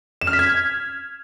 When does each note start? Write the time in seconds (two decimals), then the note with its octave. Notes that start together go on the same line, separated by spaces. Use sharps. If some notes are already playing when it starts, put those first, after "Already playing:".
0.21 E7
0.27 F6
0.33 B6
0.39 G#6